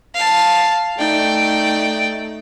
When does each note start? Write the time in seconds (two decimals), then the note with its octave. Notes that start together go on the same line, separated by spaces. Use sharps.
0.15 F5 A5
0.98 A3 D#4 D5 G5